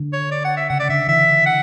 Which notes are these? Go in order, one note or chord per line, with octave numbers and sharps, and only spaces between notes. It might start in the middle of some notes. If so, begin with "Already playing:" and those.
Already playing: D3
C#5
D5
F#5
E5
C#3 F#5
D5
D3 E5
E3 E5
F#5